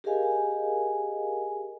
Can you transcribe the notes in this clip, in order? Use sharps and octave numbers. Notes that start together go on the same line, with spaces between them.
G4 G#4 A#4 D#5 F5 G#5